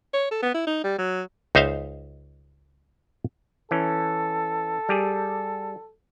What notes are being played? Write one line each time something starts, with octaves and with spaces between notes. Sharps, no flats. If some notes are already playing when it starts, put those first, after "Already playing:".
C#5
A4
B3
E4
D#4
G3
F#3
C#2 D#4 C5 E5 F5
E3 C#4 A4
G3 G4 G#4